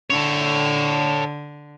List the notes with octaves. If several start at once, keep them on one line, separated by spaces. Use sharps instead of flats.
D3 A4 C#5